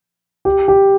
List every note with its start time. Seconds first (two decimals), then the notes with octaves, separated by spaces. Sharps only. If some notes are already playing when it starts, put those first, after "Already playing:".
0.45 G4
0.68 G4